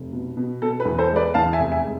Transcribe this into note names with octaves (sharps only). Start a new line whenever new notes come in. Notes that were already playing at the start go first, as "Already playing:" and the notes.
Already playing: F1
B2
B2
B2 A4
B4
E2
A4 C5
G#3
B4 D5
E2 F5 A5
E5 G#5
F1
E5 G#5
G#3